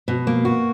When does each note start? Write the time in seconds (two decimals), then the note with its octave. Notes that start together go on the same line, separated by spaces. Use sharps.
0.08 B2
0.27 A#3
0.45 F#4